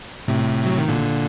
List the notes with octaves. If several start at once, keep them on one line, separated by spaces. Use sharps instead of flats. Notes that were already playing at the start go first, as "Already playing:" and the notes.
A2 C3
F#3
D#3
A#2 D3